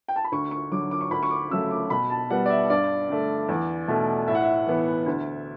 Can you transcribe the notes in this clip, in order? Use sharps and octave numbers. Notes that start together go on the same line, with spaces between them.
G5
A5
B5
D2 C#6
C#6
D3 F#3 D6
D6
C#6
D2 B5
C#6
D6
C#3 F#3 A3 E6
D6
B2 B5
A5
G3 B3 F#5
D5
E5
G2 D5
D3 A3
E2
B2 A3
A2 E5
F#5
E5
E3 B3
D2